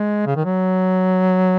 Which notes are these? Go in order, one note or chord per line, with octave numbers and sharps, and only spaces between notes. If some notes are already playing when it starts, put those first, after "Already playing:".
Already playing: G#3
C#3
D#3
F#3